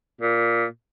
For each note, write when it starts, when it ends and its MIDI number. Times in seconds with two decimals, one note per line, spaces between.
0.21 0.65 46